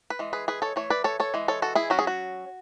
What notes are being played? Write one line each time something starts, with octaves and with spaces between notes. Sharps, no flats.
B4
E3 G#3
G#4 B4
G#4 B4
A4 C#5
E3 A3 C#5
B4 D5
A4 C#5
A4 C#5
E3 G#3
A4 C#5
F#4 A4
E4 G#4
F#3 C#4 F#4
G#4
F#4